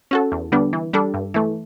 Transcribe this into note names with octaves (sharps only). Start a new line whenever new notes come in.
C#4 F#4 A4
E2
D3 G3 B3 D4
E3
G3 D4 A4
G2
E3 A3